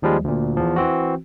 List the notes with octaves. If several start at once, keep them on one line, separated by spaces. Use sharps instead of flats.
D#2 F3 G3 G#3
D2 A#2
E2 F3
E3 C4 F#4